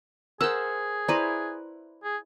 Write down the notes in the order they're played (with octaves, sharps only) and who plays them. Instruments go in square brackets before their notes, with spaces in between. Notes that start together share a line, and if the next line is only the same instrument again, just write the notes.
[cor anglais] G#4 [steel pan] A#4 E6 [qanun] C5 F#5
[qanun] E4 B4 [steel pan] C5 D5 A#5
[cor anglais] G#4